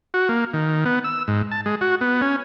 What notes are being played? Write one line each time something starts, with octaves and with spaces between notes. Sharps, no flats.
F#4
A#3
D#3
B3
E6
G#2
A5
G#3
F#4
B3
C#4